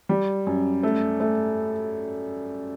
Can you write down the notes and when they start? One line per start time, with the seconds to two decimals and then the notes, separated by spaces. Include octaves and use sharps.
0.09 G3
0.47 F#2
0.83 A3
1.20 A3